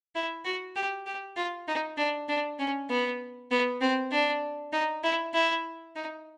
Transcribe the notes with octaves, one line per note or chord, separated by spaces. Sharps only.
E4
F#4
G4
G4
F4
D#4
D4
D4
C#4
B3
B3
C4
D4
D#4
E4
E4
D#4